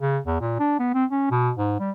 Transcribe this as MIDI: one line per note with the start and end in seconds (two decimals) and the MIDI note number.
0.01 0.18 49
0.26 0.38 40
0.41 0.57 46
0.59 0.78 62
0.79 0.92 59
0.94 1.05 60
1.11 1.30 61
1.31 1.51 47
1.58 1.79 44
1.80 1.91 55